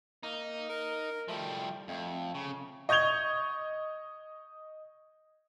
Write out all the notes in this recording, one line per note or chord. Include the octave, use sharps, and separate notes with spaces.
A#3 D#4
A#4
F3 G3 A3
F2 A3
C#3
D#5 C#6 G6 G#6 F7 G7